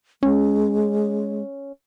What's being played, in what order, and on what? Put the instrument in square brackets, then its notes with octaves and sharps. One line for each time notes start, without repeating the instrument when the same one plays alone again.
[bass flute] G#3 [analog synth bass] C#4